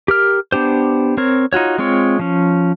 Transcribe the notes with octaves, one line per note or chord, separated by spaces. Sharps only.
G4 A#4 F6
B3 D4 G4 C5
C4 A#4 C#5
D#4 F4 F#4 C#5
G#3 C4 F4 C#5
F3 C#4